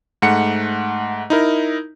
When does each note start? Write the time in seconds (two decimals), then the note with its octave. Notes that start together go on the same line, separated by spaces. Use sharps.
0.22 G#2 A3 F#5 C#7
1.30 D#4 E4 A#4